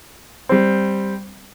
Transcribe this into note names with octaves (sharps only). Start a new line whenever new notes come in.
G3 C4